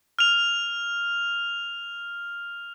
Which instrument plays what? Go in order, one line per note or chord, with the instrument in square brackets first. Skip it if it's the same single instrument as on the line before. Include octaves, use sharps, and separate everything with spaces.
[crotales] F6 F7